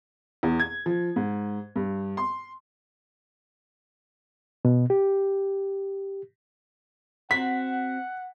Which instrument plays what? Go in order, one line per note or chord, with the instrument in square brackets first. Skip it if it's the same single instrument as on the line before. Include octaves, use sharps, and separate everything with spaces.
[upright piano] E2
G#6
F3
G#2
G2
C6
[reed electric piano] B2
G4
[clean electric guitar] C4 F#4 [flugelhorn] F#5 [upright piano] B6